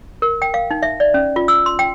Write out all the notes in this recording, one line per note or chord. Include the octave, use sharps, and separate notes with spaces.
A#4
G5
F5
D#4
E5
D5
C#4
F4
E6
C6
G5